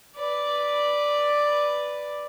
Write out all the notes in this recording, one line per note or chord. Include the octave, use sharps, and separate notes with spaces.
B4 D5